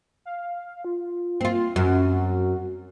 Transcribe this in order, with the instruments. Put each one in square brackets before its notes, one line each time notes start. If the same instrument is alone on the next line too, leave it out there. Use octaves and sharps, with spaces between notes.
[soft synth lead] F5
F4
[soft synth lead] A#3 [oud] C4 F4
[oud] F#2 [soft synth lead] F#4